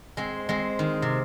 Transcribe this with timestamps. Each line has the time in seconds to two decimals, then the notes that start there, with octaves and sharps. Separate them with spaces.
0.17 G#3 C4
0.49 G#3 C4
0.79 D#3
1.02 C3